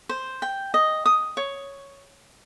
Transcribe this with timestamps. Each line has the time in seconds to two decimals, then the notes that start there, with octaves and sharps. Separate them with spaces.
0.09 C5
0.42 G5
0.74 D#5
1.06 D#6
1.37 C#5